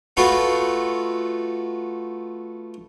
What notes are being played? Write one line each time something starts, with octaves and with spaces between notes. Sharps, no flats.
A3 B3 F4 F#4 A4